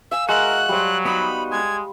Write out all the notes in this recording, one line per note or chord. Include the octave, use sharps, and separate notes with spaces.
F5 G#5 E6
G#3 F#4 A#4 E5 F#5 F#6
F#3 G3 C5
B3 D#4 F#4 B5
G#3 G#6